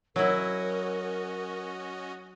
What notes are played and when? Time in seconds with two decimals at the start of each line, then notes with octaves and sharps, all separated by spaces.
0.16 F#3 C#4 E4 F#4 A#4 D#5